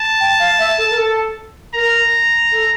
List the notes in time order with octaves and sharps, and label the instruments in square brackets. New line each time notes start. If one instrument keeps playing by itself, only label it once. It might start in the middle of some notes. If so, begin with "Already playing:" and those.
Already playing: [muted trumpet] A5
[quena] G5
F5
E5
A4
A#4
A4
[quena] A#4 [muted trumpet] A#5
[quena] A4